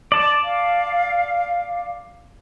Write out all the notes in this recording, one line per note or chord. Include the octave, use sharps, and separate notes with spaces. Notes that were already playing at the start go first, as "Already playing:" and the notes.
D5 A5
F5